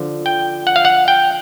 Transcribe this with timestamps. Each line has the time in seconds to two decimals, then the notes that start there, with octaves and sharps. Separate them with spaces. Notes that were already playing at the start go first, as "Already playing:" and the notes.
Already playing: D3 F3
0.26 G5
0.67 F#5
0.76 F5
0.85 F#5
1.08 G5